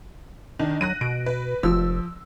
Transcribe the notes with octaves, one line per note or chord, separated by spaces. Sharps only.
D#3 D4
F#3 F#6 A#6 D#7
B2 D7
B4
F1 F3 E6